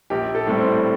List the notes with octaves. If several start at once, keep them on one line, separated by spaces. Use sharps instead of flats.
A#1 G4
A4
A2 G3 C4
C5